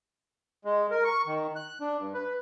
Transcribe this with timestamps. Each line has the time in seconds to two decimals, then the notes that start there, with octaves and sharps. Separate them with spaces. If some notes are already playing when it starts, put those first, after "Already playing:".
0.65 G#3
0.91 A#4
1.04 C#6
1.26 D#3
1.56 F#6
1.81 D4
1.99 G2
2.14 B4